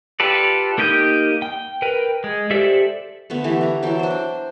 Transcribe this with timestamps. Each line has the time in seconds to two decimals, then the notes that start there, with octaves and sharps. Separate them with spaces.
0.20 F4 G4 A4 B4 D5
0.78 A#3 D#4 G4 D#5 G6
1.42 G5
1.82 A#4 B4 G5
2.24 G#3
2.51 G4 A4 C5 D5 E5
3.30 D3 A3 B3
3.44 E3 A3 G4
3.61 D3 A#5
3.82 E3 F#3 G5 A5
3.99 D4 C5
4.11 G5